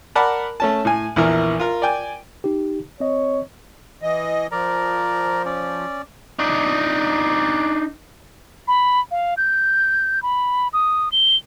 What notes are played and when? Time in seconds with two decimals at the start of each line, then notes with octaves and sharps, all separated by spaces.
0.15 A#4 D5 F#5 A5 B5
0.60 A3 C#4 A5
0.85 A2 G#5
1.16 A#1 E2 E3 A#4
1.59 F4 A#4
1.82 D5 G5 G#5
2.44 D#4 G4
3.00 C4 C#5 D#5
4.02 E3 D#5
4.52 F3 A#4 D5 A#5
5.45 C#4 D5
6.39 D4 D#4
8.68 B5
9.11 F5
9.37 G6
10.22 B5
10.73 D#6
11.12 G7